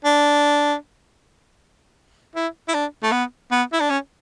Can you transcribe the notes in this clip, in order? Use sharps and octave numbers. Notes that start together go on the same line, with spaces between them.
D4
E4
E4
D4
A3
B3
B3
E4
D4
C#4